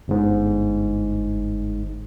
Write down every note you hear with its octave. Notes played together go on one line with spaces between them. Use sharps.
G1 G#2